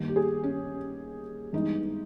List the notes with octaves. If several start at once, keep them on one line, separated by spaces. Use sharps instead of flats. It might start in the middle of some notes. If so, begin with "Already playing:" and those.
Already playing: G2 D#3 A#3
G4
G#4
C#4
G2 E3 G#3 B3 D#4